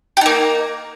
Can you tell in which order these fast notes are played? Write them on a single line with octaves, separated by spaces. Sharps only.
G4 D#4 A#3